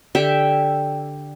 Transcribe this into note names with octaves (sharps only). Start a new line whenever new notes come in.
D3 G4 E5 G5